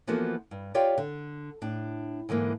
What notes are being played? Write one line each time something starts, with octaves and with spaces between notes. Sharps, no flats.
E3 F3 A#3 B3 F#4 A4
G2
F4 G4 C#5 D5 F5 G5
D3
A2 D4
G#2 D3 E3 A#3